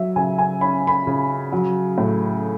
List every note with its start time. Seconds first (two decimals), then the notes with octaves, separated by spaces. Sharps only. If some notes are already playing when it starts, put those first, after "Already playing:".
Already playing: F#3 E5
0.16 C#3 G#5
0.38 G#5
0.61 C#4 B5
0.87 B5
1.07 C#3
1.52 F#3
1.98 A2